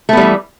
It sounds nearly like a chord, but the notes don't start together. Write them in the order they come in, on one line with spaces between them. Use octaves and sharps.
A3 B3 G3 E3